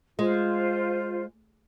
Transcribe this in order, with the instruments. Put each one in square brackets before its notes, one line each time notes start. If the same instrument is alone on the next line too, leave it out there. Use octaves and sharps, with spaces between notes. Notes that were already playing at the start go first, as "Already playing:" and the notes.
[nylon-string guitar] G#3 [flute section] F4 C5